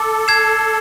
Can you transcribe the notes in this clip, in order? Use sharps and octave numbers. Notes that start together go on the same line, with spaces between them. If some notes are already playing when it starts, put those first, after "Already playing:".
Already playing: A4 D6
G#6 C7 E7